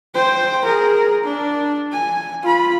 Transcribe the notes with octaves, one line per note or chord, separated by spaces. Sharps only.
C5 G5
G#4 A#4
D4
G#5
F4 B5